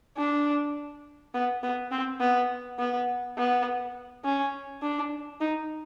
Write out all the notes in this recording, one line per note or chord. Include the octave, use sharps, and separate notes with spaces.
D4
B3
B3
C4
B3
B3
B3
C#4
D4
D#4